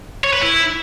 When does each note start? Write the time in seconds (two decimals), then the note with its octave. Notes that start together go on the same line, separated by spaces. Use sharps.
0.24 C#5
0.33 B4
0.43 E4